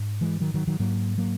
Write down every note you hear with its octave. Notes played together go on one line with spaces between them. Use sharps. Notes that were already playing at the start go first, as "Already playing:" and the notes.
Already playing: G#2
E3 G#3
D#3 F#3
D#3 F#3
D#3 F#3
G#2 F#3 A#3
F#3 A#3